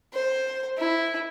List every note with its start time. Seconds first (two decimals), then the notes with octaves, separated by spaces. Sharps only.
0.13 C5
0.78 E4